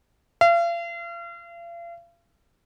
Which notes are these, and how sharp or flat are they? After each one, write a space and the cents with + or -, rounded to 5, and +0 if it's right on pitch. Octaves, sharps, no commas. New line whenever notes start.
F5 -40